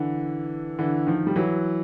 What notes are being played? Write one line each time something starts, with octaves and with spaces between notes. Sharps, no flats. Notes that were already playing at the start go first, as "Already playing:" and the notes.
Already playing: D3 E3
D3 E3
D#3 F3
G3
E3 F#3